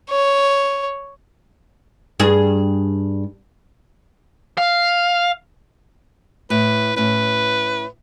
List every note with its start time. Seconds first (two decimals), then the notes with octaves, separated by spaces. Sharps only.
0.10 C#5
2.19 G2 G#4
4.58 F5
6.50 A2 B4
6.96 A2 C#4 B4